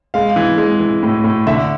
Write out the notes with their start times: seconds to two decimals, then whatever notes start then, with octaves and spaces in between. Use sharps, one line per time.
0.14 G#3 F5
0.36 E3
0.58 G#3
0.80 E3
1.03 A2
1.24 A2
1.47 D3 E5